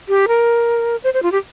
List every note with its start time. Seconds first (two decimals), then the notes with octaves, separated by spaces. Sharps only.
0.09 G4
0.28 A#4
1.04 C5
1.14 C5
1.22 F4
1.32 G4